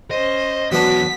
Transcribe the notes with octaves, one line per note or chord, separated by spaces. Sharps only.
C#4 C5 D#5
E2 F#3 B3 D4 F#4 B6